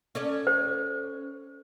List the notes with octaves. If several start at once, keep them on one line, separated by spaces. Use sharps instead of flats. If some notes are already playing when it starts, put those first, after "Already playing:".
C#4 A4 D5
C5